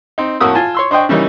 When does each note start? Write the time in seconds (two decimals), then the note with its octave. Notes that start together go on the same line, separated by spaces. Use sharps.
0.18 C4 D#4
0.40 F2 A2 A#3 F#4 D#6 E6
0.55 F4 G#5 A5
0.75 C#5 C6 E6
0.91 D4 C5 D#5 G5 C#6
1.09 C#3 E3 G3 A#3 C#4 D#4